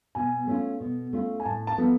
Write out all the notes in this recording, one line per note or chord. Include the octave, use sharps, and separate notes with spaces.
B2 G#5
A3 C#4 F4
B2
A3 C#4 F4
G#5
A2 A5
A5
F3 B3 F4 A4